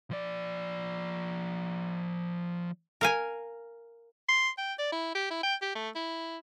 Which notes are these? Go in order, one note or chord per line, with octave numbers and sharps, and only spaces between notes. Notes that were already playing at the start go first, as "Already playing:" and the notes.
F3 D5
A#4 F5 G#5
C6
G5
D5
E4
G4
E4
G5
G4
A3
E4